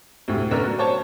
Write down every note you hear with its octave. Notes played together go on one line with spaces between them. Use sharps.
D2 A2 C3
D3 B3 C#4 D4 A#4
F#3
C5 C#5 A5